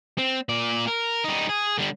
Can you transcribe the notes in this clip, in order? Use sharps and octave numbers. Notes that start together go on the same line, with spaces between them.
C4
A#2 D5
A#4
G3 D#4
G#4
D3 G3